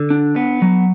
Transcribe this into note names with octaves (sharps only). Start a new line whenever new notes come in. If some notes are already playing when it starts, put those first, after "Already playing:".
Already playing: D3
D4
B3
F#3